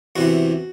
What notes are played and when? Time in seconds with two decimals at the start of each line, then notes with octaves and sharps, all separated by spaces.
0.16 E2 C3 E3 F#4